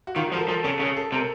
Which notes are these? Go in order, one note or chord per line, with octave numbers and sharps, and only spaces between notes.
F#4
D#3 F4
F#4
F3 A#4
A4
F3 A4
C#3 A4
C#3 A4
A4
C3 A#4